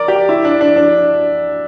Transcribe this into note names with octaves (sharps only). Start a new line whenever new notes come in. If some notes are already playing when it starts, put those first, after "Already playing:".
Already playing: A#4 D5
G4
E4
D4
D4
D4